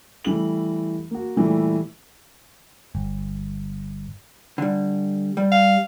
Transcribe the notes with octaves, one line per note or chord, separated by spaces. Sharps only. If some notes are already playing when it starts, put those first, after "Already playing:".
E3 G3 A3 F#7
A#3 F#4
A#2 E3 G3 A3
G1
D3 G3
G3
F5